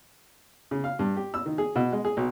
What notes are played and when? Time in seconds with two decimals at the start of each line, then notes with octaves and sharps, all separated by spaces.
0.71 C#3
0.84 F5
0.99 G2
1.17 G4
1.34 E6
1.46 D#3
1.58 G#4
1.76 B2
1.92 G#3
2.05 G#4
2.17 B1